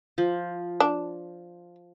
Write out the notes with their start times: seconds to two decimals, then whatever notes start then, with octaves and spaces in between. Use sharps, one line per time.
0.18 F3
0.80 D4